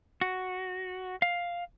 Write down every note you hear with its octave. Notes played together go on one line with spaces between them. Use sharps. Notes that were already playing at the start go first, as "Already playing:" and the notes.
F#4
F5